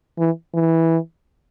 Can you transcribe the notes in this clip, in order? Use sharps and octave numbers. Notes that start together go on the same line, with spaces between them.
E3
E3